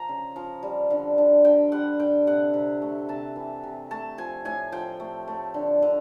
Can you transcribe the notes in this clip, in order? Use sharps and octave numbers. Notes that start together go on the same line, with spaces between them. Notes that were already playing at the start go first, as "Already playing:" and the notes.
Already playing: F3 A#5
C#3
F3
G3
D3
D3
D3 G5
G3 F#5
D3 G5
C3 F#5
C3
A3
C3 A5
E3
C3
A3 A5
F3 G#5
A2 G#5
F3 G5
A3
A3
D3
D3